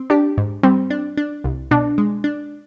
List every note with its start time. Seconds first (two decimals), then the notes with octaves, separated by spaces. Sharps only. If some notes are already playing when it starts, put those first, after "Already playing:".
Already playing: C4
0.10 D4 G4
0.37 G#2
0.63 G3 C4
0.90 D4
1.17 D4
1.44 C2
1.71 B2 D4
1.98 G#3
2.24 D4